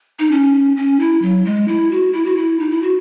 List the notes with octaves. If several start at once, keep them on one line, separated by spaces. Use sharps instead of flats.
D#4
C#4
C#4
E4
F#3
G#3
E4
F#4
E4
F#4
E4
D#4
E4
F#4